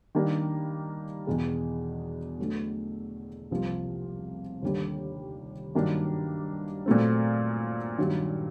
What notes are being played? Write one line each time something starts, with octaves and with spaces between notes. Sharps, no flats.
D#3 G3 A#3 D4
E2 B2 G#3
D3 F#3 A3
C2 C3 F3 A#3
D#2 D3 G3 A#3
G2 D#3 F#3 A#3 D4
A#2 F#3 A3 C4
G2 D#3 F#3